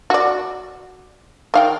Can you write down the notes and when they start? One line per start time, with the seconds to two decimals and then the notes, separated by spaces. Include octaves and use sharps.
0.10 F#4 D5
1.54 D#3 F5 G5